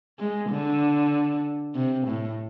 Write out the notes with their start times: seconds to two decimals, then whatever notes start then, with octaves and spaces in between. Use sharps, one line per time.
0.19 G#3
0.51 D3
1.75 C3
2.07 A2